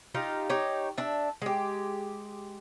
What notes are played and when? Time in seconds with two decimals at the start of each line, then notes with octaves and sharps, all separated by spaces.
0.15 D#4 F4 G4
0.49 D#4 G4 C#5
0.98 D4 E5
1.42 G#3 G4